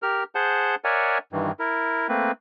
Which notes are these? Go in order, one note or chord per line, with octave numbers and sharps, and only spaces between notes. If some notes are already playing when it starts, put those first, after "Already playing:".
G4 A#4 F6
G#4 C5 F#5 A5 G6
A#4 C#5 D5 E5 F#5 G#5
G2 D#3 E3
E4 A#4
A3 A#3 C4 B4